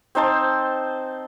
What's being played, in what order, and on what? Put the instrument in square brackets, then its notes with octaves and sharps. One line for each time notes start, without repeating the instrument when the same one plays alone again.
[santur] C4 D#4 C5 A5